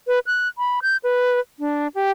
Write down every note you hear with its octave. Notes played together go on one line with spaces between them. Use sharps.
B4
F#6
B5
G6
B4
D4
G4